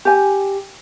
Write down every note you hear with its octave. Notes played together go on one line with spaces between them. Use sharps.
G4 G#5